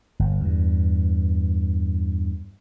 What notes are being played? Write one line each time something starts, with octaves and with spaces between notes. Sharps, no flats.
G1
E2 G2